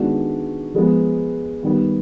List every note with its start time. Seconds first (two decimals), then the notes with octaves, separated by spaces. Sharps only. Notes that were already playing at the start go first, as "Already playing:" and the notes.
Already playing: D#3 G#3 B3 D4 F#4
0.74 F3 G#3 B3
1.63 D#3 G3 B3